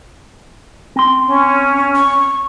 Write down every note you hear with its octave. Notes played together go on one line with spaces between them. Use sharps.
C4 C6
C#4
C#6